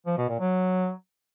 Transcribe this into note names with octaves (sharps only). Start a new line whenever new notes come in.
F3
B2
A#2
F#3